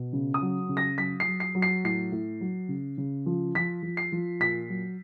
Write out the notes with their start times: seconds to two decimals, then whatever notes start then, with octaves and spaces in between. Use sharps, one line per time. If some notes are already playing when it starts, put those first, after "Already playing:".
Already playing: B2
0.13 C#3
0.34 D#6
0.42 F#3
0.69 C#3
0.77 A#6
0.98 F#3 B6
1.20 C7
1.27 F#3
1.40 C7
1.55 F#3
1.62 C7
1.84 A2 C7
2.12 A2
2.41 F#3
2.69 C#3
2.98 C#3
3.26 F3
3.55 F3 B6
3.83 F3
3.97 C7
4.12 F3
4.40 A#2 B6
4.69 F#3